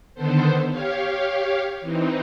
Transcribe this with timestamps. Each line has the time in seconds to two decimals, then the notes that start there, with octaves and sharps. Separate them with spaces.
0.15 D3 D#3 B3 A4 C5
0.68 G4 C#5 F5
1.81 E3 C4 D#4